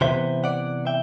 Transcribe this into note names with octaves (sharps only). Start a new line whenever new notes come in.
C3 E3 B3 C5 E5
D5 F#5
E5 G5